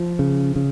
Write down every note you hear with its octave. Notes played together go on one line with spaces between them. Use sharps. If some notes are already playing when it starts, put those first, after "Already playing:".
Already playing: F3
C#3
C#3